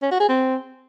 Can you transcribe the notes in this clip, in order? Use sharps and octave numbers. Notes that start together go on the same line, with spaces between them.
C#4
F#4
G#4
C4